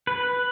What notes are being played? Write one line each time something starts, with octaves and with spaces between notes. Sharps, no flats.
B4